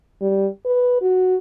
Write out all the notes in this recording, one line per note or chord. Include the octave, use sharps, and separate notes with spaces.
G3
B4
F#4